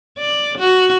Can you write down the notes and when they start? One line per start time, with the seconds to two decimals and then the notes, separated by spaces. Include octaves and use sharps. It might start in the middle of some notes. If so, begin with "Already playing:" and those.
0.18 D5
0.58 F#4